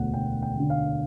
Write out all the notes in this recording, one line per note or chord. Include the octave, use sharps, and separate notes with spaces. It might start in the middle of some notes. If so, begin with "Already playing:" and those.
Already playing: E1 D2 D3 F#5
E1 G5
G5
D2 D3
F5